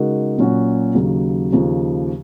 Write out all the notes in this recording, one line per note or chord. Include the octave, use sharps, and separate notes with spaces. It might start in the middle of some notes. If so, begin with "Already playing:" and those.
Already playing: C#3 G#3 D#4 F#4 A#4
A#2 F#3 C#4 F#4
D#2 C#3 F#3
D#2 C#3 F3